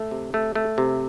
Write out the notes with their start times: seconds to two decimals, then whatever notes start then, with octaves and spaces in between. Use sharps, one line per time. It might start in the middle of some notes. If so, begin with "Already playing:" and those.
Already playing: A3
0.11 C3
0.34 A3
0.55 A3
0.78 C3